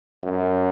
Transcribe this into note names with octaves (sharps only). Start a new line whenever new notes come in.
F#2